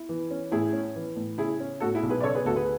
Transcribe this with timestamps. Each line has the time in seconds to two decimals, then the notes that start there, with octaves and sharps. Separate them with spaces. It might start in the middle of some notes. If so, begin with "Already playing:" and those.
Already playing: E4
0.09 E3
0.31 C#4
0.51 A2 E4 G#4
0.73 C#4
0.96 E3
1.16 A2
1.38 C#3 E4 G#4
1.60 C#4
1.80 A2 F#4 A4
1.95 E4 G#4
2.03 B1
2.10 G#4 B4
2.20 D5
2.23 C#3 A4 C#5
2.35 G#4 B4
2.45 D2 F#4 A4
2.56 G#4 B4